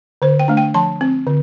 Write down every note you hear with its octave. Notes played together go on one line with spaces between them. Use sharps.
D3 C5
G5
A3 D4
G5
F3 A5
C4
D3